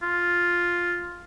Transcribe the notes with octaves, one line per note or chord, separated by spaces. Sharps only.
F4